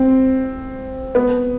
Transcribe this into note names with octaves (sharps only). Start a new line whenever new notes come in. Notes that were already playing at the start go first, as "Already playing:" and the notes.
Already playing: C4
B3